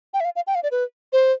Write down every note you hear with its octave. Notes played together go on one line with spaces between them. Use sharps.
G5
E5
F5
F5
G5
F5
D5
B4
C5